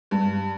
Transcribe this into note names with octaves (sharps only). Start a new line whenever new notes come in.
G2